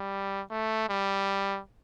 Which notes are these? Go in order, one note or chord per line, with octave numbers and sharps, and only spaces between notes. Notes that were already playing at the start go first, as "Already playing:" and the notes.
Already playing: G3
A3
G3